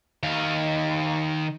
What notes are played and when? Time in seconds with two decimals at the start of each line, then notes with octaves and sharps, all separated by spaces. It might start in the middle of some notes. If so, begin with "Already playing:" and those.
0.23 D#3 F5